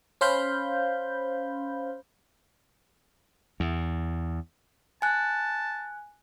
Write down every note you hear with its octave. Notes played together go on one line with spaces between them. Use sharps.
C#4 C5 F5 B5 G6
E2
G#5 A5 F#6